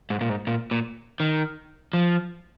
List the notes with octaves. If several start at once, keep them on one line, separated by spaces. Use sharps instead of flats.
G#2
A#2
G#2
A#2
A#2
D#3
F3